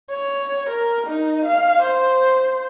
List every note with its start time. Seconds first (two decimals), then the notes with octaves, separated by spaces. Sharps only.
0.10 C#5
0.69 A#4
1.07 D#4
1.46 F5
1.82 C5